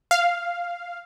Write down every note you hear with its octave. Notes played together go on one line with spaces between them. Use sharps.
F5